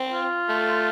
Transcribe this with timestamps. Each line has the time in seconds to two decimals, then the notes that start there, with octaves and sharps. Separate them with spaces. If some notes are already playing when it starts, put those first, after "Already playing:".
Already playing: C4
0.12 F4
0.49 A3